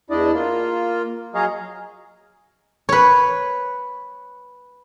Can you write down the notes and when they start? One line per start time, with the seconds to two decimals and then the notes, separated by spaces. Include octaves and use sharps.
0.10 E2 D4 E4 D5 D#5
0.34 A#3 F4
1.35 F#3 G#4 C#5 D#5 F5 A#5
2.89 B4 C#5